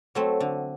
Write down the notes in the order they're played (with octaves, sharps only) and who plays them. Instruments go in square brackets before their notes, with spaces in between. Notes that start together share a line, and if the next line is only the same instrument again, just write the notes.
[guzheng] F#3 A3 C4
D3